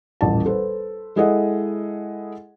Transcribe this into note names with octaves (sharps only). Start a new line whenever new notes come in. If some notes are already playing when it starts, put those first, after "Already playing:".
D#1 A1 A5
A4 B4 C5
G#3 E4 G#4 A4 D#5 F#5